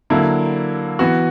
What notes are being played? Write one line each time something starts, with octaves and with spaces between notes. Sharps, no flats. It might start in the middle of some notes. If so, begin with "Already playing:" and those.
D3 F#3 A#3 E4
E3 B3 F#4